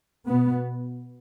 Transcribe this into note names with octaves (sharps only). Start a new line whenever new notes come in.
B2 B3